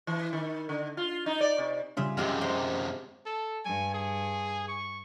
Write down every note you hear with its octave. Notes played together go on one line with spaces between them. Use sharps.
E3
D#3
D3
F4
D#4
D5
C3
C#3 G3 C#4 F4 G#4 E5
F#2 C3 G#3 G4 G#4 F5
G#3 G4 C5
A4
G2 G#5
G#4
C#6